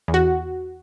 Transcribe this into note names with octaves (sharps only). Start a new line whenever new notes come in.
E2
F#4